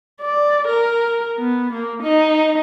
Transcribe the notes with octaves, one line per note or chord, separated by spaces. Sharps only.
D5
A#4
B3
A#3
D#4